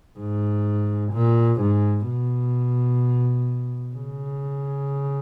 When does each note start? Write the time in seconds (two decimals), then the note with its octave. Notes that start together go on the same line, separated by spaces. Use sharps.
0.19 G#2
1.13 A#2
1.60 G#2
2.07 B2
3.96 C#3